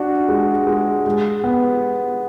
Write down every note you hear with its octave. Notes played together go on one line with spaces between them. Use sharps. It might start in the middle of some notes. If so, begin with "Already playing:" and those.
Already playing: D4 F#4
G#3
G#3
G#3
B3